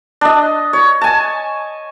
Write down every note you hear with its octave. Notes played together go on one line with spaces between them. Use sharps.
D4 D#5
C#5
G#5 A5